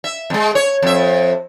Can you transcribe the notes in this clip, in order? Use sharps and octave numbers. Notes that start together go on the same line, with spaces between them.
E5
F2 G#3
C#5
F2 E5